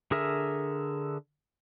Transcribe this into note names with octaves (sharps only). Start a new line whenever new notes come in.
D3 G#4 A#4 E5